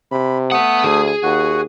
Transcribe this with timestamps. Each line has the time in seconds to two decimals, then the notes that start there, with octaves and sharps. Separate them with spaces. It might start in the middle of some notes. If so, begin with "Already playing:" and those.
0.12 C3 B5
0.51 A3 B3 F#5 D#6
0.84 D2 G#4
1.23 D#2 F#4 F#5